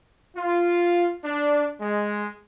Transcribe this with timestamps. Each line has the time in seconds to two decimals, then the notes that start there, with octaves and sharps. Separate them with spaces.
0.37 F4
1.25 D4
1.80 G#3